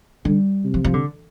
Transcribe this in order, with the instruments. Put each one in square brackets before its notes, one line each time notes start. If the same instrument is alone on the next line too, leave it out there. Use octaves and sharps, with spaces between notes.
[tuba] D3 [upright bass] G3
[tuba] C3
[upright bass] F3
F3
D3